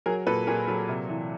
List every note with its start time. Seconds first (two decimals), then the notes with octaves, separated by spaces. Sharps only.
0.06 F#3 G#4 A#4
0.27 A#2 A4 B4
0.47 A#2 G#4 A#4
0.68 F#3 A4
0.89 C3
1.09 E3